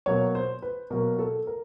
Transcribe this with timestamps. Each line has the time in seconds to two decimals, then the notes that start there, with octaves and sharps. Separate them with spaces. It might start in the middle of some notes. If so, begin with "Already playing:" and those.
0.06 B2 F#3 A#3 C#5
0.35 C5
0.62 B4
0.91 B2 F#3 A#3 A#4
1.19 A4
1.47 A#4